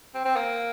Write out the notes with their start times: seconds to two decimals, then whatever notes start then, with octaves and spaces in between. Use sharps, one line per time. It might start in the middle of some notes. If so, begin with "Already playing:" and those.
0.15 C4
0.25 C4
0.36 A#3